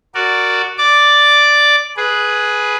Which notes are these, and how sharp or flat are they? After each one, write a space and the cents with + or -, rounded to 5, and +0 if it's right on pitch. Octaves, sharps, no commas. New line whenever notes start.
F#4 +0 A#4 -15 D5 +0
D5 +0 D6 +0
G#4 +10 B4 -10